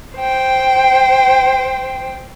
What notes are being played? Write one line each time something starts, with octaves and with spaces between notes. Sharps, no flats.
C5 G5